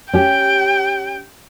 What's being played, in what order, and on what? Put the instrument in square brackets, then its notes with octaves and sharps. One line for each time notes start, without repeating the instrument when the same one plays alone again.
[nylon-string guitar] C#4 G4 [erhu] G5